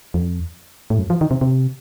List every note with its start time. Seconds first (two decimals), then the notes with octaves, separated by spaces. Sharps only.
0.14 F2
0.90 A2
0.99 F#2
1.10 F3
1.21 D#3
1.31 C3
1.41 C3